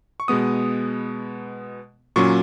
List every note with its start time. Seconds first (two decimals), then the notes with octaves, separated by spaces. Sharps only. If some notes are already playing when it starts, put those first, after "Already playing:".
0.20 C#6
0.28 B2 G#3 B3 D#6
2.16 A#2 F#3 C#4 C#6